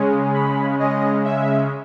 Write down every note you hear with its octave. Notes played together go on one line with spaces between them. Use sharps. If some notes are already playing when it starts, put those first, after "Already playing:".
Already playing: C#3 G#3 C#4
B5
C#3 G#3 C#4 D#5
E5